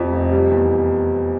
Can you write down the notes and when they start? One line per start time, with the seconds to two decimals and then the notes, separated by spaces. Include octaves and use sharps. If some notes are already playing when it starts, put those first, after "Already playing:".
Already playing: F2 C3 F3
0.12 F1
0.32 G3
0.51 E2